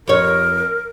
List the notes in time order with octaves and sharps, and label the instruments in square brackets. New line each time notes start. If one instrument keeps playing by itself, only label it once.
[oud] F2 C#5 [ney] A#4